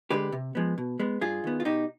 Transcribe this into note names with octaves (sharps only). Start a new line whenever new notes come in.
D3 G#3 G4 B4
C3
F3 G#3 B3
B2
G#3 B3
G2 F4 G#4
D#3 B3
F4
B2 D#4 G4